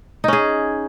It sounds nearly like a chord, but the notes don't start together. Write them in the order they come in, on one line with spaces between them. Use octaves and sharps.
D#4 C#4 G#4